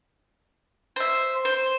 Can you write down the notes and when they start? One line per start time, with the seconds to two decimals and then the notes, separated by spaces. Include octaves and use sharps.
0.96 C5 E5
1.45 C5